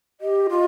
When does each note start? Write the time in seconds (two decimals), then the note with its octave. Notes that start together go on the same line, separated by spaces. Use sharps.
0.21 G4 D#5
0.50 F4